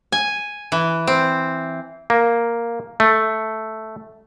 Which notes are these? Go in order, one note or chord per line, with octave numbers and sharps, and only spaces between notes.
G#5
E3
C4
A#3
A3